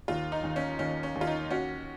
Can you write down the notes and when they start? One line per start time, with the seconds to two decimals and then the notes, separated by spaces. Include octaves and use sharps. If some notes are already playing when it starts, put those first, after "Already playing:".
0.08 D#2 F4
0.32 D#4
0.43 D#2
0.56 C#4
0.79 D#2 C#4
1.03 C#4
1.15 D#2
1.21 F4
1.27 D#4
1.50 C#4 F#4